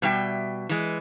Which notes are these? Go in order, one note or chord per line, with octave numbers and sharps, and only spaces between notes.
B2 G3 E5 G5
E3 G#3